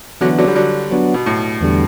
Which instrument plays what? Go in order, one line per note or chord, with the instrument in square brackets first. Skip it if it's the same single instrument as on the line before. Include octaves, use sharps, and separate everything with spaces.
[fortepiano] D3 F#3 [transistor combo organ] E3 B3 D4
[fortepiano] D3 F#3
G3
D3 F#3
[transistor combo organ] F#3 B3 D4 F#4
[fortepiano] B2
A2
[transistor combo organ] E2 D3 G3